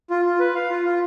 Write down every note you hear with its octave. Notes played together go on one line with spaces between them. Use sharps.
F4
F4
B4
F5
F4
F4